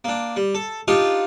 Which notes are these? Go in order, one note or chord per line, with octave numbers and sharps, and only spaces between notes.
A#3 D4
G3
A4
D4 D#4 F4 G4 F5